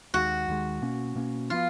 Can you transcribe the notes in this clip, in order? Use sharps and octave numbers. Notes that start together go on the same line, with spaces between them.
D#2 D#3 G#3 F#4
D#2 D#3 G#3
B2 A#3 C#4
B2 A#3 C#4
F3 B3 F4